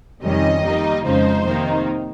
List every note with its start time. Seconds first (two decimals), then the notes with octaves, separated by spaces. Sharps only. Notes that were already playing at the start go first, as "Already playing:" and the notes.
0.22 F2 C3 D#3 G3 C#4 D#5
0.64 D#3 G3 A#3 D#4
1.05 F2 C#3 F3 G#3 D#4 C5
1.45 C3 D#3 A#3 D#4